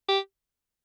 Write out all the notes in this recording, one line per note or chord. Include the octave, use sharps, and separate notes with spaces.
G4